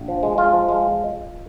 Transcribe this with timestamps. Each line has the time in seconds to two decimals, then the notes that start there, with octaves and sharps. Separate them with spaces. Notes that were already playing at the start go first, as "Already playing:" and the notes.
Already playing: A#1
0.08 F3
0.23 G#3
0.38 G#3 F4
0.53 F3
0.69 G#3